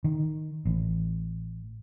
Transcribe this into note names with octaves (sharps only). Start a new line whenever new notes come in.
D#3
A1